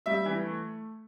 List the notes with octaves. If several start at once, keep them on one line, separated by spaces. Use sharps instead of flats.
G3 E5
E3
A3